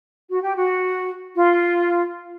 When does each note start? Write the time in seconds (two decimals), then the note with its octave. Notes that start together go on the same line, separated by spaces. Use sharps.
0.31 F#4
0.43 G4
0.57 F#4
1.35 F4